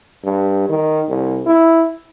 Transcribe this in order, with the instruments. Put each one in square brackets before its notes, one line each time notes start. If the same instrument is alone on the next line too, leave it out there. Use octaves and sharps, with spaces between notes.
[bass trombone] G2
D#3
C2
E4